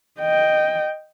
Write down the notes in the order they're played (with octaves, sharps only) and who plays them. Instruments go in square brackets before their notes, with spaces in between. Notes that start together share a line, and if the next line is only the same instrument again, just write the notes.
[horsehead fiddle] D#5 G5